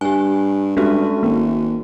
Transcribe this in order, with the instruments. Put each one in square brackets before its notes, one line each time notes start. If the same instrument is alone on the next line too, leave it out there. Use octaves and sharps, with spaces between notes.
[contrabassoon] G2 [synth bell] G4 G#5
[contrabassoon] G2 [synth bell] G#3 C#4 F#4 [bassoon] A3
[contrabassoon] G#1 [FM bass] A#3